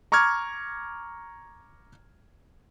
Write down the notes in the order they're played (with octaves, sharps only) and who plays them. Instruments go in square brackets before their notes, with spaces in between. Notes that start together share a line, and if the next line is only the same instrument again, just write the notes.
[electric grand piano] A#5 C#6 D6 F6 G#6